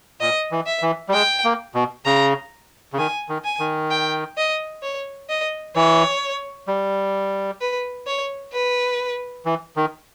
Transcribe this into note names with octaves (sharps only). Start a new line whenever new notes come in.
A#2 D#5
E3
E5
E3
G3
G#3 G5
A#3
B2
C#3 A#5
C#3
D#3 G#5
D#3
G#5
D#3
G5
D#5
C#5
D#5
E3 C#5
G3
B4
C#5
B4
E3
D#3